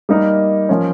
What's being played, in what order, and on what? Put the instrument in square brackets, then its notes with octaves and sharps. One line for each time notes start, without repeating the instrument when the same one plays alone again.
[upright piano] G3 A#3 D#4 A#4
F3 A#3 C#4